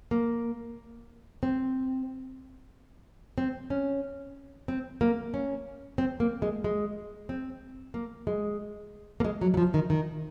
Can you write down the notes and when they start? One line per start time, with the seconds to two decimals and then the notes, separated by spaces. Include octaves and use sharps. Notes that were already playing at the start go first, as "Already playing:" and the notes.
0.11 A#3
1.43 C4
3.38 C4
3.70 C#4
4.68 C4
5.01 A#3
5.34 C#4
5.98 C4
6.20 A#3
6.42 G#3
6.64 G#3
7.29 C4
7.94 A#3
8.27 G#3
9.20 A#3
9.24 G#3
9.41 F#3
9.54 F#3
9.57 F3
9.74 D#3
9.90 D#3